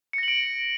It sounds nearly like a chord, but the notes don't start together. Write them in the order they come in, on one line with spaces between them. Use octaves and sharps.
C#7 A#6 F#7 D7